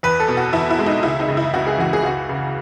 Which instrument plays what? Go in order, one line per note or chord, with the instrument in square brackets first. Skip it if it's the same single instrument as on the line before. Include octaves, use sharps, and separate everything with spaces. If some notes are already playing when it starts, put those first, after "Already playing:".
[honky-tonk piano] E2 B4
A4
B2
F#4
E2 E4
E4
G#3
D#4
C#2 E4
D#4
C#3
E4
C#2 F#4
G#4
E3 F#4
G#4
C#2 F#4
C#3